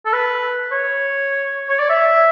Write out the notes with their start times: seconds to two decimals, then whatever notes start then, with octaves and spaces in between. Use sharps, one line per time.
0.06 A4
0.13 B4
0.72 C#5
1.69 C#5
1.79 D5
1.90 E5